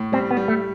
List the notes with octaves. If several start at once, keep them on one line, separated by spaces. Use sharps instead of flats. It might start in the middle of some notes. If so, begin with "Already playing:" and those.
Already playing: A2
G3 C4
B3
G3
A3